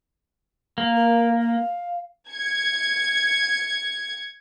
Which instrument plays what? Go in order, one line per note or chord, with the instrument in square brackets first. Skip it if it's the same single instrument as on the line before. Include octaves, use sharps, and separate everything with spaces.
[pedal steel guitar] A#3
[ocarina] A#4
F5
[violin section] G#6 C#7